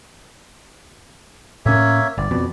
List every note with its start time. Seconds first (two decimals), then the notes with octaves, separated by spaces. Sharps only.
1.66 A2 A#3 C#4 C#5 E5
2.18 G1 D5
2.31 F2 B2